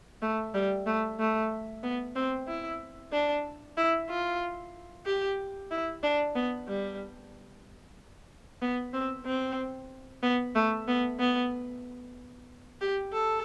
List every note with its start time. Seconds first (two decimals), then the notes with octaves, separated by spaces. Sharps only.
0.22 A3
0.54 G3
0.86 A3
1.19 A3
1.83 B3
2.16 C4
2.48 E4
3.12 D4
3.77 E4
4.09 F4
5.06 G4
5.71 E4
6.03 D4
6.35 B3
6.68 G3
8.62 B3
8.94 C4
9.26 C4
10.23 B3
10.55 A3
10.88 B3
11.20 B3
12.81 G4
13.13 A4